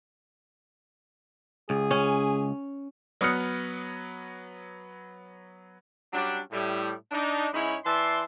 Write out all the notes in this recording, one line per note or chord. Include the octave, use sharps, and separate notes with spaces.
C#2 G#4
C#4
F#3 B3 D#6 F6 F#6 C#7
F#3 G3 C#4 D4
A2 G3
D4 D#4
G#2 C#4 D#4 E4 C#5 B5
E3 D5 E5 A5 C6